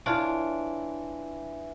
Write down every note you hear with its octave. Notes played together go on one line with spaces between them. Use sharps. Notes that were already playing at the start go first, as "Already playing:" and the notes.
E3 D4 E4 F4 C#5 D7